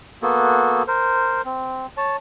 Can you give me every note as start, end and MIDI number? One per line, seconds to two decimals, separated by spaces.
0.22 0.83 58
0.22 0.83 59
0.22 0.83 66
0.22 0.83 69
0.88 1.42 70
0.88 1.42 72
1.45 1.86 60
1.97 2.16 73
1.97 2.16 81